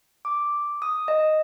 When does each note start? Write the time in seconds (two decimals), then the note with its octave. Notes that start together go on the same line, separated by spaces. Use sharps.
0.25 D6
0.82 D#6
1.08 D#5